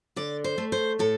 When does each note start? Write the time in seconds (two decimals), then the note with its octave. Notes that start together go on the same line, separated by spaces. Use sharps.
0.16 D3 D5
0.44 C5
0.58 A3
0.72 C5
0.99 A2 A4